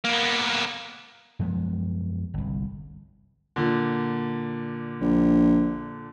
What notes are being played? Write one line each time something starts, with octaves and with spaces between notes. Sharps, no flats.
A#3 B3
F#2 F3 G#3 B3
G1 C2
A#2 D3
A#1